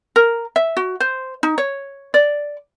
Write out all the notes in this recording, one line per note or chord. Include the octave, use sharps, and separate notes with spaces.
A#4
E5
F#4
C5
D#4
C#5
D5